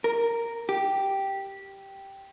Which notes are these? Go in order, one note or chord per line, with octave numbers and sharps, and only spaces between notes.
A#4
G4